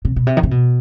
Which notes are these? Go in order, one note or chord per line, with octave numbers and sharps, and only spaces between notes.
C3
B2
C3
D#3
C3
B2